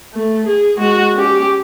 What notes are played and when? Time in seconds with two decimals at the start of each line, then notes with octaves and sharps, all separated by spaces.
0.14 A3
0.47 G#4
0.77 G#3 F#4
1.14 C#4 G4